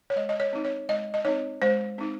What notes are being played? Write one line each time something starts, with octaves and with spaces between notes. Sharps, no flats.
C#5
G#3 D#5
D#5
C#5
C4 D#4
C#5
G#3 D#5
D#5
C4 D#4 C#5
G#3 C5
C4 D#4